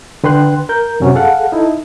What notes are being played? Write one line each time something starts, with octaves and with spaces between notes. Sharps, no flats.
D3 B4 G5 C6 F#6
A#4 G6
F#2 C3 F#3 C#4
G#4 A4 F5 F#5
D#4 E4 A4